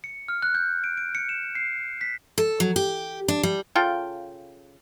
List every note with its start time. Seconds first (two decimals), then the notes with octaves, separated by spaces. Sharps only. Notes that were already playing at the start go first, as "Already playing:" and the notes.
0.04 C#7
0.28 F6
0.42 F#6
0.55 G6
0.84 D7
0.97 D7
1.15 C#7
1.29 E7
1.55 C7
2.01 B6
2.38 A4
2.60 F#3
2.76 G4
3.28 D4
3.43 G3
3.75 C#3 F4 A4 G5